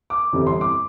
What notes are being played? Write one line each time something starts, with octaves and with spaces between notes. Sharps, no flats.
D6
G1 F2 C3 E3 G3
C6
D6